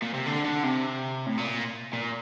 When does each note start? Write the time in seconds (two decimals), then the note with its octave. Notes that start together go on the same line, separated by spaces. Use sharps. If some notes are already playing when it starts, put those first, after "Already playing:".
0.02 A#2
0.14 C3
0.26 D3
0.45 D3
0.63 C3
1.26 A2
1.38 A#2
1.93 A#2